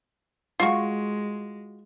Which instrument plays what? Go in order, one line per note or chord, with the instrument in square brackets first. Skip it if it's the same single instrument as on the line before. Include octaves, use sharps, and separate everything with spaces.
[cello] G#3 [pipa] F4 F#4 C#6